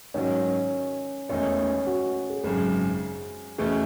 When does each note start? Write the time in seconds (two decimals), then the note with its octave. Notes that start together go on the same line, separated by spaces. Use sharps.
0.14 G#2 D#3 F#3 C#4
1.29 E1 E2 D#3 A3 C#4 D#4
1.86 F#4
2.30 G#4
2.44 G#1 F#2 C#3 G#4
3.58 E2 B2 A3 C#4 G#4